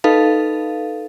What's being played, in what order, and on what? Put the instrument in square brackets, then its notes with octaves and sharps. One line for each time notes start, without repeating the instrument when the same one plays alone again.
[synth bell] D#4 A4 B4 F5